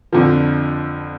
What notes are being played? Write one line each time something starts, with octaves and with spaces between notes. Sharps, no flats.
F2 D3 F3